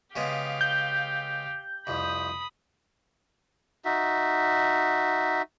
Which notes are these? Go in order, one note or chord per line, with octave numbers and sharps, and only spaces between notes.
C#3 G#3 B3 G4 F5
G6
C2 F2 B5 D#6
D#4 F#4 E5